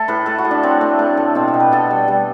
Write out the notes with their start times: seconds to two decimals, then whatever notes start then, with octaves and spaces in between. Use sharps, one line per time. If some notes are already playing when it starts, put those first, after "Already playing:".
Already playing: A3 A4
0.08 A2 B4
0.26 A3 A4
0.38 F#4
0.45 A2
0.51 D4
0.63 A2 C4
0.81 A3
0.99 A3
1.17 A2
1.35 B2 C4
1.48 G4
1.54 B2
1.60 B4
1.72 B2 A4
1.91 G3
2.08 G3